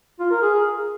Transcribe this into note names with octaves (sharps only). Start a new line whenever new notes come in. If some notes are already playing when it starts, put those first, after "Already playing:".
F4
A#4
G#4